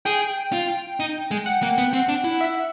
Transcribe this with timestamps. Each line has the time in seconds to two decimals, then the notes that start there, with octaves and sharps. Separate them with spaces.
0.05 G#4 G5
0.52 F4
1.00 D#4
1.31 G#3
1.46 F#5
1.63 A#3
1.78 B3
1.93 C4
2.09 D4
2.24 E4
2.41 E5